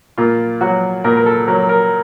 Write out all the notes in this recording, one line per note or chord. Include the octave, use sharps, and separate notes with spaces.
A#2 F4
F#3 F#4
A#2 A#4
A#4
A4
F#3 A#4
A#4